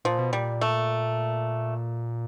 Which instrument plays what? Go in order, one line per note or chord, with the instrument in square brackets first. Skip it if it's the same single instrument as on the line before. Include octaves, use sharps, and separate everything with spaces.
[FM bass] A#2 [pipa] F3
[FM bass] B2
[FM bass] A#2 [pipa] G3
[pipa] A3